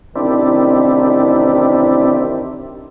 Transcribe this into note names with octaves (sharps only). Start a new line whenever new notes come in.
A1 C3 D#3 C4 D4 E4